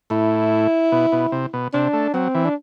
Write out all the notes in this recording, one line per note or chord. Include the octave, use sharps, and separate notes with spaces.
A2 E4
B2
B2
C3
B2
C3 D4
A3
F#3 C4
E3
D4